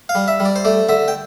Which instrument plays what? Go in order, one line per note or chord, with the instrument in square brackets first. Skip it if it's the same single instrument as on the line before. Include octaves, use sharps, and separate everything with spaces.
[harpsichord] F5
G3
E5
G3
D5
C5
A3 D5
D3 E5
G5